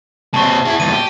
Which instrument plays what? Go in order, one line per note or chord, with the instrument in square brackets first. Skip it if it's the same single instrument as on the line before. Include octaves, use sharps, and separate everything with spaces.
[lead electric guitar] A#2 C4 [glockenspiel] A5 C#6
[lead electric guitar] E4 G#4
[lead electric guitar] E2 A#2 [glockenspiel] D#7
[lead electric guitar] G4